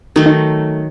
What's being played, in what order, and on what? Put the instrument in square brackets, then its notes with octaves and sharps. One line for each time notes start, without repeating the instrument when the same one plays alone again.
[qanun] D#3 F#3 A3 [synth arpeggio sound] D#4
[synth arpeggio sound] D#4